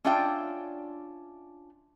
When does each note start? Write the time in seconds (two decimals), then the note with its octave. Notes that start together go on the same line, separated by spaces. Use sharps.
0.04 C#4 D4 F4 D5 E5 G5